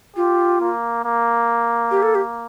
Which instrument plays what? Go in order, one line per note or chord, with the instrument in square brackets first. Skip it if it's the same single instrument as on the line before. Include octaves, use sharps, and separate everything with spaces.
[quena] F4 [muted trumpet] G4
[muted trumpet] A#3
A#3
[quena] G4
A4
G4